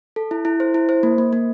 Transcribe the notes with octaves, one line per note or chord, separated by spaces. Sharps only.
A4
E4
E4
C5
E4
C5
A#3
A#3
A#3